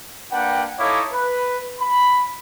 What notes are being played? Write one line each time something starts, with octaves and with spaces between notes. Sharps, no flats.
A#3 D4 B4 F#5 G5
D#4 E4 A4 C#5 F5 D6
B4
B5